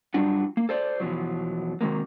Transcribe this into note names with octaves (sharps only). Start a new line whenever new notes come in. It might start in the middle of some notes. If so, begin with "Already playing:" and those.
G2 F#3 G3 D4 F4 F#4
A#3
A4 C5 D5
E2 B2 F3 F#3
C3 D#3 F#3 G#3 A#3